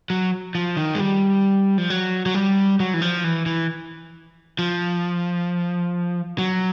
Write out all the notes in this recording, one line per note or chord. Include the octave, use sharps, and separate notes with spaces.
F#3
F3
D#3
G#3
G3
F3
F#3
F#3
G3
F#3
E3
F3
E3
E3
F3
F#3